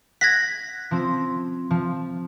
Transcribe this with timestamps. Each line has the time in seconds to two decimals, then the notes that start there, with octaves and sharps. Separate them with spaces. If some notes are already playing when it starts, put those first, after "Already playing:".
0.21 F#5 G#6 A#6 B6
0.91 F3 C4
1.70 F3